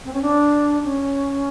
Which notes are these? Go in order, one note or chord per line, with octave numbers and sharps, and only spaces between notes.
C4
C#4
D4
C#4